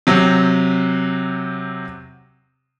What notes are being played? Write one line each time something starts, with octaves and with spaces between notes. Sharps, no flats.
C3 F#3 C4